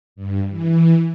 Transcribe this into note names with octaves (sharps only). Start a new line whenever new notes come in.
G2
E3